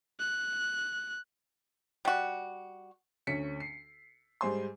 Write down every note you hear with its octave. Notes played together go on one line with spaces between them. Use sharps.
F#6
G3 F#4
D2 C#4 B6 C#7
C7
G#2 G3 C5 G#5 C6